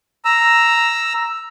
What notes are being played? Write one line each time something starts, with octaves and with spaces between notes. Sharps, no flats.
A#5 E6